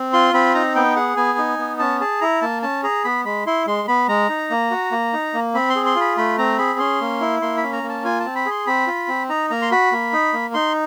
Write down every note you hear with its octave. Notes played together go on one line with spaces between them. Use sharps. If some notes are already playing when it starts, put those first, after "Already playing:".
Already playing: C4
F4 C6
C4 B5
D#4 A#5
B3 G5
G#4 F#5
B3 G#5
D#4
B3
C#4 A5
G#4 A5
E4 A#5
A#3 A5
C#4 A5
G#4 A#5
B3 B5
G#3 B5
E4 C6
G#3 C6
B3 B5
G#3 A#5
D#4
A#3
F#4
A#3
D#4
A#3
C4 B5
C6
G#4
C6
F4
B5
A3 B5
C4 A#5
G#4 B5
C#4 C6
A#3
E4
A#3 C6
B5
C#4
A#5
A#3
A5
F4 G#5
C4 A5
B5
G#4 C6
C4 B5
F4
C4
D#4 A#5
A#3 A#5
C6
F#4 B5
A#3
D#4
A#3
D#4 C6